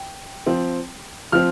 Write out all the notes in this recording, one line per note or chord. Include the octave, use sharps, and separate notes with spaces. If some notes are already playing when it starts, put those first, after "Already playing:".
Already playing: G5
F3 C4
F3 C4 F6